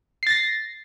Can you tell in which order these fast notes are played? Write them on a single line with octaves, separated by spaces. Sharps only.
C7 A6 A#6